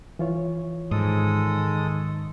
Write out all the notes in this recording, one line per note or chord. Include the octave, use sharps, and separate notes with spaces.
E3 F4 C#5
G#2 D#3 G#3 A4 D#6